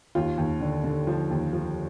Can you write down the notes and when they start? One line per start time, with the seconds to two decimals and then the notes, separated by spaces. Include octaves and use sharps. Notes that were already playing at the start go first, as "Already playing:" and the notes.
0.15 D#2 F4
0.37 D#2
0.60 D3
0.84 D3
1.07 F3
1.30 D#2
1.53 F3